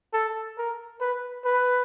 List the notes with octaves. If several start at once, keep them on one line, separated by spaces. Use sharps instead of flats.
A4
A#4
B4
B4